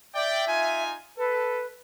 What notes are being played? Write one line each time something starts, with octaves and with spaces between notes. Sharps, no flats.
D5 E5 G5
D#4 F4 G#5
A4 B4